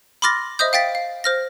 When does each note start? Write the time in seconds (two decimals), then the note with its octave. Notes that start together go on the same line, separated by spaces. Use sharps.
0.22 B5 C6 D6 F6 A6 A#6
0.59 C5 D#5 E5 D#6 G6
0.73 F5 G5 A6 B6
0.95 F5
1.24 C5 F6 A#6